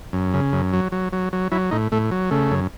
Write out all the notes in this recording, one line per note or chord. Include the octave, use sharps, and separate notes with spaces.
F#2
C#3
F#2
F#3
F#3
F#3
F#3
F#3 E4
A2 D#4
A2 A3
F#3
C#3 A3
F#2